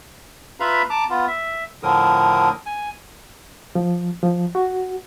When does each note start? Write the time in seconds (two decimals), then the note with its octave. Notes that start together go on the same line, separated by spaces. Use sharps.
0.60 F4 B4 E5 F5 A#5 B5
0.90 A5 A#5 D6
1.10 B3 F4
1.28 E5
1.83 A2 D3 F3 A#4 D#6
2.66 G#5
3.75 F3
4.23 F3
4.55 F#4